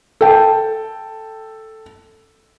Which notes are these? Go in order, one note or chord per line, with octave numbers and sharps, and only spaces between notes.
A4 G5